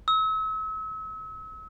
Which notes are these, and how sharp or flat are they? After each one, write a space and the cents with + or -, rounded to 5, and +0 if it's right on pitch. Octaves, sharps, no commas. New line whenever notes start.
E6 -40